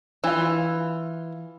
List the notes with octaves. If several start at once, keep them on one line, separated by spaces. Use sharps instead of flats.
E3 F4